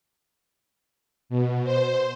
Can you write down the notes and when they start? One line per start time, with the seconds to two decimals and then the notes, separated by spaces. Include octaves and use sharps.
1.29 B2
1.64 C5